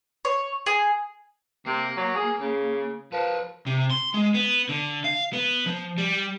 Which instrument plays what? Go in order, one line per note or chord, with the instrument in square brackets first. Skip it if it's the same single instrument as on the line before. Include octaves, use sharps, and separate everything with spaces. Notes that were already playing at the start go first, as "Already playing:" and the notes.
[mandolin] C#5
G#4
[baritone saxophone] C3 [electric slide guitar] A#3
[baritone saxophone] F#3
G#4
C#3
[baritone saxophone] F3 [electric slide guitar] A#4 B4
[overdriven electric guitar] C3
C6
G#3
B3
D3
F5
B3
F3
G3